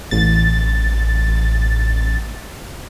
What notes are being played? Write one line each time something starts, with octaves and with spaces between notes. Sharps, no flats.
A1 A6